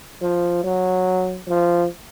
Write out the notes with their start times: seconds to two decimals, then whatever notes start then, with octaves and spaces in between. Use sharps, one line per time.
0.22 F3
0.64 F#3
1.48 F3